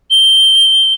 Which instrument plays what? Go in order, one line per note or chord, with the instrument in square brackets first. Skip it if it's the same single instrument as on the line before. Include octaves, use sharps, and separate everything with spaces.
[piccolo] G7